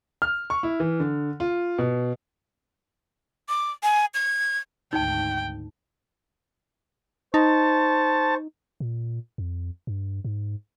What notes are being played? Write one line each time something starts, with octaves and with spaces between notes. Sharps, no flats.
F6
C#6
E4
E3
D3
F4
B2
D6
G#5
G#6
G#1 D2 D#4 G5 A5
D#4 C5 A5 C#6
A#2
F2
G2
G#2